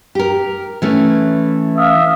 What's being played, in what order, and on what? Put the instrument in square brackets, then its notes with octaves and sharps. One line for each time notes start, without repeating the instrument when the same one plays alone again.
[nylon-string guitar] G4 A#4
E3 A3 C#4
[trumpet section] E5 F5 D#6